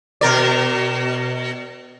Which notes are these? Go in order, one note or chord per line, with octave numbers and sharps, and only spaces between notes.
B2 A#4 D5